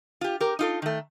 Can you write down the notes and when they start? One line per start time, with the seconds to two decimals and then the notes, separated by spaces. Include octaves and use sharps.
0.21 F4 G4
0.40 G4 A#4
0.59 D#4 F4 A4
0.82 D#3 A3